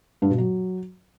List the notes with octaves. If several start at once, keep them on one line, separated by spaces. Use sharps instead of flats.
G2
B2
F#3